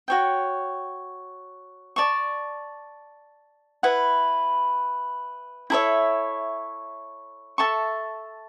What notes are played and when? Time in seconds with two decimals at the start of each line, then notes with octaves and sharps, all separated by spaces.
0.08 F#4 C#5 G5
1.96 D5 A5 C#6
3.83 E4 B4 F#5
5.70 E4 A4 C#5 E5
7.58 A4 E5 A5 C#6